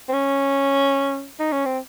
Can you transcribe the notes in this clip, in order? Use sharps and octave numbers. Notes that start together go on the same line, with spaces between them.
C4
C#4
D#4
C#4
C4